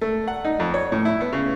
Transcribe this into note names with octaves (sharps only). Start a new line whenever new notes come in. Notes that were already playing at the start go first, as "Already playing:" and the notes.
A3
F#5
D#4
F2
C#5
A2
E4
B3
C#3